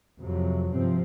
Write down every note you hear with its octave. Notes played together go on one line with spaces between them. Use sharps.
F2 C3 F#3
G2 C3 F3 C4